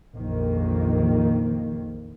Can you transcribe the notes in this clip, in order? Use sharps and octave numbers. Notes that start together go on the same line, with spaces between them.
A#1 F2 D#3 A#3